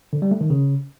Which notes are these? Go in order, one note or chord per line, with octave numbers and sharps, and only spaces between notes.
D3
G3
A3
D#3
C#3